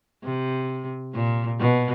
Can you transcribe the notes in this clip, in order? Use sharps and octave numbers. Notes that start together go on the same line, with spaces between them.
C3
A#2
B2